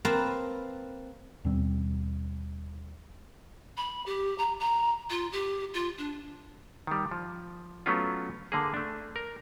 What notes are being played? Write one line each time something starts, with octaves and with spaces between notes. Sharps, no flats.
A#3 C4 A#4 B4 A5
D#2 B2 G3 C4
B5
G4
A#5
A#5
F4
G4
F4
D4
D#3 G3
F3
F#3 A3 B3 C#4 F4
D3 A#3 G#4
A3 D4
A#4